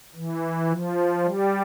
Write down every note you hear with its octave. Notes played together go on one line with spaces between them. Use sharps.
E3
F3
G3